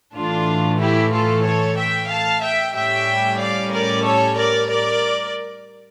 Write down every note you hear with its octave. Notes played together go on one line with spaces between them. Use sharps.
A2 E3 A3 D4 F4
E4 G4
F4 A4
A4 C#5
E5 G5
F5 A5
E5 G5
A2 G3 C#4 E5 G5
D5 F5
A#4 D5
A4 C#5
A#4 D5
A#4 D5